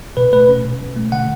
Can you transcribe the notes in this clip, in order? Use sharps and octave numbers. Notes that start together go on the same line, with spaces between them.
B2 B4
A3 B4
C#4
B2
B2
A3
D3 F#5